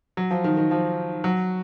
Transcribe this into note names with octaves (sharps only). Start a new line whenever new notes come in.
F#3
F3
D#3
D#3
F3
F#3